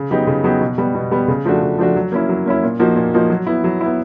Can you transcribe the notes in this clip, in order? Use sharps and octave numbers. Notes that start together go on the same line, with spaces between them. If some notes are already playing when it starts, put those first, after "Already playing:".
Already playing: C#3
F#3 B3 D#4 G4
C#3
F#3 B3 D#4 G4
B2
G3 B3
B2
G3 B3
C#3
F3 A3 D4 F#4
C#3
F3 A3 D4 F#4
F#3
A#3 C#4 E4
F#3
A#3 C#4 E4
A#2
F3 A#3 D#4 F#4
A#2
F3 A#3 D#4 F#4
F#3
B3 E4
F#3
B3 E4